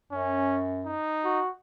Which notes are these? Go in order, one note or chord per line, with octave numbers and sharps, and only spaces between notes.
F#2 C#4
D#4
F#4